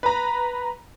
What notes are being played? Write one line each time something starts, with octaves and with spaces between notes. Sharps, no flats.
B4 A#5